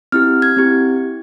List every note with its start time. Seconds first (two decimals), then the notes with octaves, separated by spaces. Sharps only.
0.12 C4 E4 G4 F6
0.42 G#6
0.57 C4 E4 G4